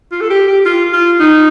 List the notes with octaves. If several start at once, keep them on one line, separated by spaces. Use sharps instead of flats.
F4
A4
G4
G4
F4
F4
D#4